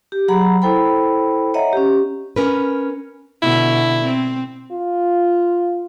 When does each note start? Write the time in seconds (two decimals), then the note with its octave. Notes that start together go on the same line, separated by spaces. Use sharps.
0.12 G4
0.28 F#3 G#4 F#5 A#5 B5
0.62 E4 A4 C5 G5 B5
1.54 C#5 D#5 E5 F#5 A#5
1.73 C#4 G4
2.36 C#4 A#4 B4
3.42 B2 D3 E4
4.03 C4
4.72 F4